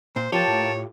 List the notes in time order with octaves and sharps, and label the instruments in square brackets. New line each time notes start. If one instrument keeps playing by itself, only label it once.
[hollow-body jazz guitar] A#2 [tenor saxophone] C5
[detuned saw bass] F3 [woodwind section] A#3 G5 A5 [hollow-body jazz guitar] F4 G4 [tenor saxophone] C#5
[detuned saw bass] A2